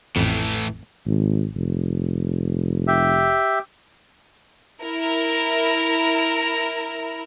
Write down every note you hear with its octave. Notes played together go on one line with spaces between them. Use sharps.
A1 F2 A2 E3
G#1
F1
G4 E5
E4 A#4